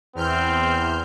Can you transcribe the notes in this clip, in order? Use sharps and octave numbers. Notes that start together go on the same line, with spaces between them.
E2 C4 F6 G6